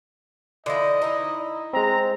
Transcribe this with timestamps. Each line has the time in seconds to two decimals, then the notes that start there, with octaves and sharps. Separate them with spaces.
0.66 D3 F3 E4 D#5
1.02 D#4 E4
1.73 G#3 C4 A#5